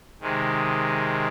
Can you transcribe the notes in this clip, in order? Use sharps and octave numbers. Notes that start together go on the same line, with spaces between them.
C3 D#3 G#3